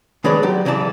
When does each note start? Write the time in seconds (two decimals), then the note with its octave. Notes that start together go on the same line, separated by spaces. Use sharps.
0.24 D#3 G#3 D4 B4 C#5 D5
0.43 F#3 G4
0.65 C#2 E3 G3 D5 A5